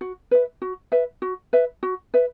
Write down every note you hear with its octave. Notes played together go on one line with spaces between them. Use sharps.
F#4
B4 E5
F#4
B4 E5
F#4
B4 E5
F#4
B4 E5